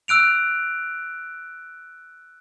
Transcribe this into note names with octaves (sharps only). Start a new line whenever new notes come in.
E6 F#6 D7 F7